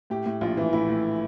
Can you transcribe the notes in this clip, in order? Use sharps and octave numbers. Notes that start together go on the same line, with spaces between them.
A2 G4
A2
A#1 F4
E3
A2 E4
A2